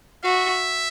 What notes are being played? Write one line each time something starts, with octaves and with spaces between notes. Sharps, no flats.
F#4 E5